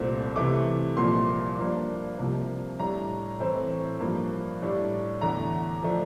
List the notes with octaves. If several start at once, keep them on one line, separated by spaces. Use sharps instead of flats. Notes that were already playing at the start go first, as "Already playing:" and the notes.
Already playing: C2 A#2 A3 C4
C3 E3 A3 D6
C2 A#2 F3 A#3 C6
G2 F3 A#3 D4
C2 C3 F3 A#3
A2 G3 D4 A#5
A2 E3 A3 C4
G2 F3 A#3
A2 G3 D4
E2 D3 A3 A#5
F3 A3 D4